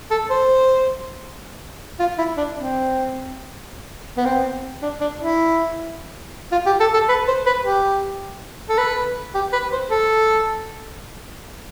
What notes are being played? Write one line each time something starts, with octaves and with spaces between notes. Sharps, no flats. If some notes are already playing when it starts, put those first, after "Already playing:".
A4
C5
F4
E4
D4
C4
B3
C4
D4
D4
E4
F4
G4
A4
A4
B4
C5
B4
G4
A4
B4
G4
B4
C5
A4